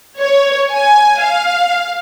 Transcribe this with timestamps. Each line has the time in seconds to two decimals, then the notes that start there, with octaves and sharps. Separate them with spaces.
0.18 C#5
0.72 G#5
1.24 F5